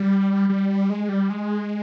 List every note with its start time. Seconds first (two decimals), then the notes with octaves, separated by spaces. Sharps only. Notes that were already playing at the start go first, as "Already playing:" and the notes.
Already playing: G3
0.49 G3
0.90 G#3
1.09 G3
1.30 G#3